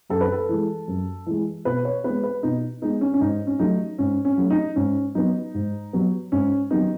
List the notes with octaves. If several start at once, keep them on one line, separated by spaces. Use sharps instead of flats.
F#2 A4
B4
A4
E3 G#3
F#2
E3 G#3
B2 B4
C#5
G#3 B3 B4
B4
B2 D#4
G#3 B3 D#4
C#4
C#4
G#2 D#4
C#4
F#3 A3 D#4
G#2 C#4
C#4
F#3 A3
D#4
G#2 C#4
F#3 B3 D#4
G#2
F#3 B3
G#2 C#4
D#3 F#3 B3 D#4